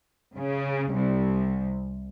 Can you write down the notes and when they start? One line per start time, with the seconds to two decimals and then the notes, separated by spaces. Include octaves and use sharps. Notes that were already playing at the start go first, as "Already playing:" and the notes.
0.36 C#3
0.93 C2